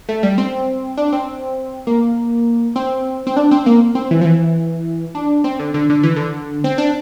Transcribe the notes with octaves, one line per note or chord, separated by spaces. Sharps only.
A3
G3
C4
D4
C4
A#3
C4
C4
D4
C4
A#3
C4
E3
F3
E3
D4
C4
D3
D3
D3
E3
D3
C4
D4